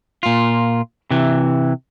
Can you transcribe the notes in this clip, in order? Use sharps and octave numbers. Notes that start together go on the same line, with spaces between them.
A#2 F4
C3 E3